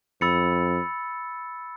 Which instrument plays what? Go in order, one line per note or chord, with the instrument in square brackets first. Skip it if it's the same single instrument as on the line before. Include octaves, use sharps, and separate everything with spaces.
[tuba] F2 [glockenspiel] B5 E6 A6 C#7